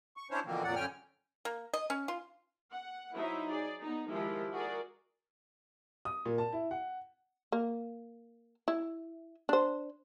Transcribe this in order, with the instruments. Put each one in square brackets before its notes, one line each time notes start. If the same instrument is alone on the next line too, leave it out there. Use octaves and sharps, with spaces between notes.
[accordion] C#6
C#4 D4 E4 C5 C#5
B2 D3 E3 F3 A#3 C4
F2 A#2 C#3 F#3 D5 F#5
F#2 D3 C#4 G5 G#5 F6
[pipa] A#3
D#5
C#4
F4
[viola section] F#5
F#3 D#4 E4 C5 E5
G#4 D5
B3 D#4
D#3 F3 G#3 E4 F4 G4
F#4 G#4 A#4 D5
[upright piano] D#6
A#2
A5
E4
F#5
[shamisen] A#3
E4
D4 C5